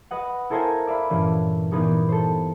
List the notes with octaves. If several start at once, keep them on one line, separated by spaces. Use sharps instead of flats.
B4 D#5 F#5
E4 A4 A#4 C5 F5 G#5
D5 E5 F5 B5
G2 A#2 E3 A3 C#4
A#2 E3 B3 D#4 G4
A4 C5